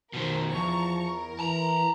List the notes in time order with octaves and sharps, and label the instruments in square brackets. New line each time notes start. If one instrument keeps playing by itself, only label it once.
[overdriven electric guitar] B2 D#3 [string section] A#4 C5
[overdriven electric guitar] B1 E2 [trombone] F3 [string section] A5 A#5 C#6
[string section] A#4
[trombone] E3 [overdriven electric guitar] A5 A#5